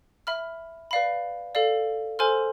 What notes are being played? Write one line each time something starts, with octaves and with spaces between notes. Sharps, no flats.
E5 B5 F6
B4 D5 F5 B5
A4 D5 F5
A4 C5 G#5 C6 F6